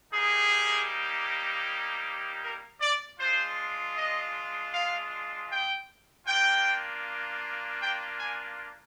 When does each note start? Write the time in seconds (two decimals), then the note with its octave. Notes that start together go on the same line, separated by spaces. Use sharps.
0.12 G3 A#3 D#4 G4 G#4
2.42 A#4
2.81 D5
3.19 G#3 D4 F4 C5
3.97 D#5
4.73 F5
5.50 G5
6.26 A#3 D4 F4 G5
7.80 G5
8.18 G#5